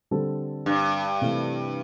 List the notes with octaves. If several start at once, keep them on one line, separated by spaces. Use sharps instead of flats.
D3 G3 C4 A4
G2
C3 E3 A3